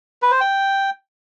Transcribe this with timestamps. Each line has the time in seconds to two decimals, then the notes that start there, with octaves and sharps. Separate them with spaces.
0.22 B4
0.32 C5
0.41 G5